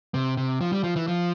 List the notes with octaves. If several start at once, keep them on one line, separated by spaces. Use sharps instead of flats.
C3
C3
F3
G3
F3
E3
F3